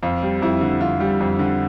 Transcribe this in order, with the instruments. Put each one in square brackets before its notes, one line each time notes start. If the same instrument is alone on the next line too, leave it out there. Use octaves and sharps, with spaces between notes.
[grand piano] F2 F4
G3
F2 E4
D3
F2 F4
G3
F2
D3